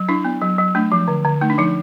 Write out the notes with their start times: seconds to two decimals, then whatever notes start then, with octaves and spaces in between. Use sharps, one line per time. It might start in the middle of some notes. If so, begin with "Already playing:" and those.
Already playing: F#3
0.09 D4 E4
0.24 B3
0.41 F#3
0.58 F#3
0.75 A3 D4
0.92 F3
1.08 D3
1.25 D3
1.41 A3 D#4
1.50 D4
1.58 F3 D#4